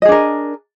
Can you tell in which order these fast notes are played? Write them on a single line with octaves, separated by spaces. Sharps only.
D#5 G#4 D4 A#4